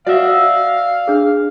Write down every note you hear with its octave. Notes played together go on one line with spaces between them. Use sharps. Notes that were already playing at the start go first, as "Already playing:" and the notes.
F#4 D5 E5 F5
D4 G#4